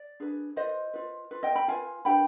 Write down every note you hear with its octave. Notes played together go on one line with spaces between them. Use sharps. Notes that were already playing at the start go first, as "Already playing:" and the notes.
Already playing: D5
D4 G#4 B4
F4 B4 C5 D#5
F4 B4
F4 B4
D#5 G5
G5 B5
F4 B4 F5 G#5
D4 G4 B4 G5 B5